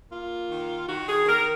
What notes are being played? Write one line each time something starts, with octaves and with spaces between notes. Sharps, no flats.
A#3 F4
D#3
D#3 F#4
G#4
D#3 A#4